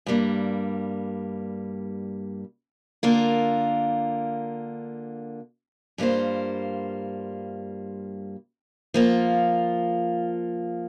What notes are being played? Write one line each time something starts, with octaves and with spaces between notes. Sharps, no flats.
G2 G3 A#3
D3 A#3 F4 A#4
G2 G3 A#3 F4 C5
F3 A#3 F4